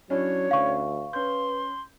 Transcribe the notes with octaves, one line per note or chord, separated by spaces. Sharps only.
F#3 C#4 D4 E4 C#5
D2 F5 C#6
C#4 B4 C6 G6